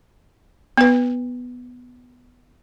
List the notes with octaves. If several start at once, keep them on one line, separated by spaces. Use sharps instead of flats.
B3 B4